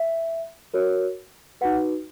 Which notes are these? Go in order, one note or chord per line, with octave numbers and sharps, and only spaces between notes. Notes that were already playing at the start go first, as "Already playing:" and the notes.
Already playing: E5
F#4 A#4 C#5
D#4 F#4 B4 F#5